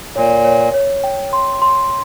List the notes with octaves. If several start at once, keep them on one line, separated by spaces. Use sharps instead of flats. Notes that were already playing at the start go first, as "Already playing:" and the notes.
A#2 C#5
C#5
C#5
G5
C6
C6